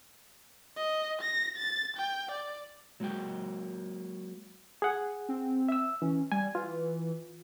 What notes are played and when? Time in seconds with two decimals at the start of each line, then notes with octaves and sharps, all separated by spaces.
0.77 D#5
1.22 A#6
1.57 A6
1.97 G5
2.32 D5
3.00 F#3 G#3 A#3 F#4 G5
4.82 G#4 F#5
5.29 C4
5.69 E5 E6
6.02 E3 C#4
6.32 G3 G#5
6.55 E3 F4